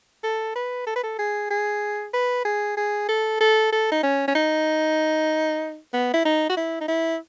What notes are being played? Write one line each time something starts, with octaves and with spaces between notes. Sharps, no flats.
A4
B4
A4
B4
A4
G#4
G#4
B4
G#4
G#4
A4
A4
A4
D#4
C#4
C#4
D#4
B3
E4
D#4
F#4
E4
D#4
E4